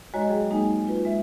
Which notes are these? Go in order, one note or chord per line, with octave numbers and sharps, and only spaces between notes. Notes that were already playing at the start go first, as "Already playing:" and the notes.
D#2 G#3 F#4 C#5 D#5 A#5
F#3 G#4 D5 G5
G#3 A#3 D#4 G#4 G#5
F4 B4
G#3 E5